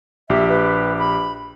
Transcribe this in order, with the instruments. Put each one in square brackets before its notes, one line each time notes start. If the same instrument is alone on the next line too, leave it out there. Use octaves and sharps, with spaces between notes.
[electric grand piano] A#1 G4 [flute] E5
[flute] B4
B5